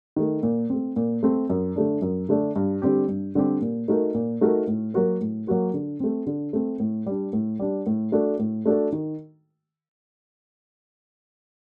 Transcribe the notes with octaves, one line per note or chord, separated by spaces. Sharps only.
D#3 A3
A#2
A3 C4
A#2
A3 C4
F#2
D3 A3 D4
F#2
D3 A3 D4
G2
D3 G3 C4 G4
G2
D3 G3 C4 G4
A#2
A3 D#4 F#4 A#4
A#2
A3 D#4 F#4 A#4
A2
F#3 A#3 F#4 A#4
A2
F#3 A#3 F#4 A#4
D3
A3 C4
D3
A3 C4
A2
G3 D4
A2
G3 D4
A2
A3 D4 F#4 A4
A2
A3 D4 F#4 A4
D#3